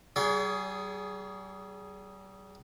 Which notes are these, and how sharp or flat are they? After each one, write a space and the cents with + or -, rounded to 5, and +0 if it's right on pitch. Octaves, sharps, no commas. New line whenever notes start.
G3 -35 G#4 +0 C#5 +40